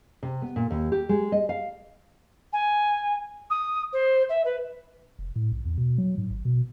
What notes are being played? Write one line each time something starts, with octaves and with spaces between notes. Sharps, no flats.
C3
B3
A#2
D#2
G4
G#3
D#5
F5
G#5
D#6
C5
E5
B4
F1
A2
B1
E2
B2
F#3
G#2
G#1
B2